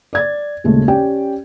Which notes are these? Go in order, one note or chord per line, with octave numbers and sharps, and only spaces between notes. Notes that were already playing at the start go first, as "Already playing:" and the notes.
D5 G#6 A6
D#2 A#2 C#3 G#3 A3
C#4 G4 D5 G5